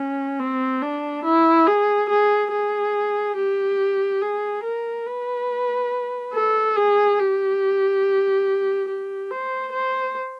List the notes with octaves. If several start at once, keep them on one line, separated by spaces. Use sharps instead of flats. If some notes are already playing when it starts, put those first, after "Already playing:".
Already playing: C#4
C4
D4
E4
G#4
G#4
G#4
G4
G#4
A#4
B4
A4
G#4
G4
G4
C5
C5